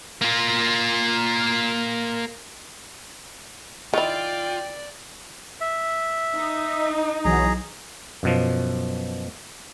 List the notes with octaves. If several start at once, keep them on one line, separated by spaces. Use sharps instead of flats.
A#3 F4
D#3 E4 F4 D5 G5
E5
D#4
B1 E3 F#3 G#4 A#5
F#2 B2 F3